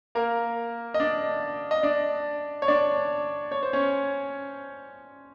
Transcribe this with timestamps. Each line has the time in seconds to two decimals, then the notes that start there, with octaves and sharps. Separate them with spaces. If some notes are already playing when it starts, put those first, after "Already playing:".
0.15 A#3 A#4
0.94 D#5
1.00 D4 D5
1.71 D#5
1.83 D4 D5
2.62 C#5
2.68 D4 D5
3.52 C#5
3.63 C5
3.73 C#4 C#5